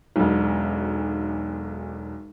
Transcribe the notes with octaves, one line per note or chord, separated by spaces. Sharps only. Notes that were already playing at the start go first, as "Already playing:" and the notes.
E1 B1